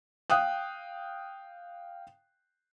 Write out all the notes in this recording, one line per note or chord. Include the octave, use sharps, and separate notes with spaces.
F5 G5 D#6 F#6